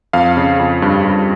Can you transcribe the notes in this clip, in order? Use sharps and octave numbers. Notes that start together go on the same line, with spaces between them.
F2 F5
C#3
F2
G2
G2